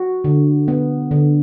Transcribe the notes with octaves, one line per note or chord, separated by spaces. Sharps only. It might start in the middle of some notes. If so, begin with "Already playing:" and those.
Already playing: F#4
D3
B3
D3